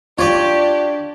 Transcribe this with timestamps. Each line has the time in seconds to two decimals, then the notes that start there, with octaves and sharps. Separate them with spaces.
0.18 D4 F4 G4 C#5 D5